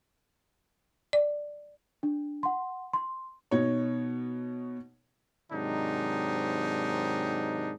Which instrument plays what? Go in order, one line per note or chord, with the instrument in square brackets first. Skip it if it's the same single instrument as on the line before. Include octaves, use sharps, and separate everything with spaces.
[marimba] D5
[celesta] D4
F#5 C6
C6
[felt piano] B2 D#4 C#5
[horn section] G#2 C3 D#3 F#3 D4 D#4